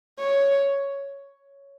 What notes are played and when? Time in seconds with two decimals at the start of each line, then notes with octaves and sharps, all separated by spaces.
0.19 C#5